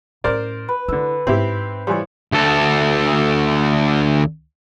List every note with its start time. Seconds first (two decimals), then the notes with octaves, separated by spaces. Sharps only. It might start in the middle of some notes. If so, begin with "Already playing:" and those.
0.24 A2 C#4 A#4 C5 D5
0.69 B4
0.88 D3 E4 E6
1.27 G#2 C4 E4 G4
1.87 E3 F3 G3 C#5
2.33 D2 A4